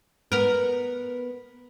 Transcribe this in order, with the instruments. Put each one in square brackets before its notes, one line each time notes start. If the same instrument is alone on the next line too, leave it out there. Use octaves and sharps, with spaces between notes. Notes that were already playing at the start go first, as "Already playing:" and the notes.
[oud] B3 A#4